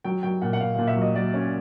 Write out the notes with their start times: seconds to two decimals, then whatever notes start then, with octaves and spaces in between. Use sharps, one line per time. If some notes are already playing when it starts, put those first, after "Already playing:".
0.04 F#3 G5
0.23 F#3 G5
0.42 A#2 F#5
0.53 F#5
0.60 A#2 F5
0.75 A#2 F5
0.87 E5
0.97 F#3
1.02 D#5
1.15 F#3 D5
1.34 C#4 C#5